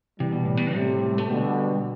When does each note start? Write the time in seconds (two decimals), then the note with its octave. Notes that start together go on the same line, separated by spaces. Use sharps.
0.20 C3 E3 G3
0.32 B2
0.45 A2
0.57 B2
0.74 A2 C3 G3
1.18 A3
1.29 B2 D3 G3